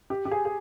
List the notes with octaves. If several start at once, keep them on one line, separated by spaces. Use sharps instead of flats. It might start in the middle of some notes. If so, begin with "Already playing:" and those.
G4
G4
G#4
G#4